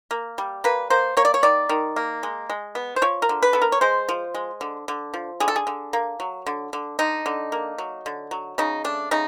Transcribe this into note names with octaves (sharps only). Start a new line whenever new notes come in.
A#3
G3
A#3 B4
A#3 C5
A#3 C#5
D5
C#5
D#3 D5
D#3
A#3
G#3
G#3
B3
C5
F3 C#5
A#4
D3
B4
B3 A4
A#4
C#5
G#3 C5
F3
G#3
D3
D3
F3
D3 G#4
A4
G#4
D3
A#3
F#3
D3
D3
D3 D#4
D3
A#3
F#3
D3
F#3
C#3 D#4
A3 D4
C#3 D#4